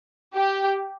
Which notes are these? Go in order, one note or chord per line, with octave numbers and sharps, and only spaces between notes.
G4